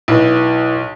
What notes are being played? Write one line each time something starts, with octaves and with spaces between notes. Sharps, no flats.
B1 E4 B4